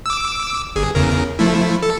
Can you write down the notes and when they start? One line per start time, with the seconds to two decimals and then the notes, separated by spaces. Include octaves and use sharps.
0.06 D6 E6
0.76 G1 G#4
0.95 E2 C#3 A#4
1.39 F3 A3 E4
1.83 A4